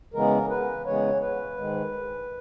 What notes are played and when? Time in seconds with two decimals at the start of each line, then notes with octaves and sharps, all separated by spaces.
0.13 C#3 E3 G#3 B3 A#4
0.50 B4
0.85 C#3 E3 G#3 B3 C#5
1.21 B4
1.57 G#2 D#3 G#3